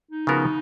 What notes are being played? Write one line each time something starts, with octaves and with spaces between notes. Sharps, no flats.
D#4
C#3 F3 B3 F#4 A#4